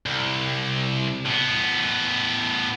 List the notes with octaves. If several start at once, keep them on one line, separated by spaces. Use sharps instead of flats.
C2
A2 B3